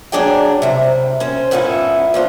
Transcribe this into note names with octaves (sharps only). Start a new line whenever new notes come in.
F#3 D4 G#4 D5 G5
C3 G3
C#4 C5
F2 G#2 B3 C#4 D#4 E4
F3 D4 C5